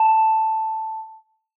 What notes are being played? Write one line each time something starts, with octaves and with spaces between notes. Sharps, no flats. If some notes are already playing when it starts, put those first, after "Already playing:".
Already playing: A5